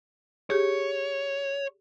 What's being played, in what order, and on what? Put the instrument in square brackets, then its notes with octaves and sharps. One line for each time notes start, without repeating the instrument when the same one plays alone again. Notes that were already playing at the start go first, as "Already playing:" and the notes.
[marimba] G4 G#4 [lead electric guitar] C#5